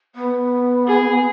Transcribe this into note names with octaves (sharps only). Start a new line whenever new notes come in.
B3
G#4